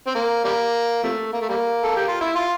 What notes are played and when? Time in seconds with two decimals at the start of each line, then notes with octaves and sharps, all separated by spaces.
0.07 C4
0.15 A#3
0.45 G3 A#3
1.03 C3 F3 A3
1.33 A#3
1.41 A3
1.49 G3 A#3
1.83 A4
1.96 G4
2.08 F4
2.21 E4
2.36 F4